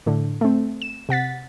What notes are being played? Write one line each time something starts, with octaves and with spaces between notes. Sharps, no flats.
A2 D3
A3 C4
E7
C3 F#5 A6 B6